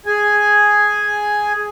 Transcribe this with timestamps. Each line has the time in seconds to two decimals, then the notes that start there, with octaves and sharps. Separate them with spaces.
0.06 G#4 G#5